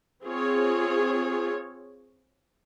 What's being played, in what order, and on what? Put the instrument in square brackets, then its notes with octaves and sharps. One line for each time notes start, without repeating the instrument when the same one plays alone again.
[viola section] C4 F4 G#4 C#5